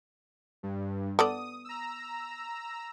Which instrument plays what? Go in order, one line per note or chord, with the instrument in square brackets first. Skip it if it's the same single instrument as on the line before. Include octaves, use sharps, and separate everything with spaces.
[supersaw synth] G2
[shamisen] B3 A4 D5 [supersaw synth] D#6
[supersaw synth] A#5 E6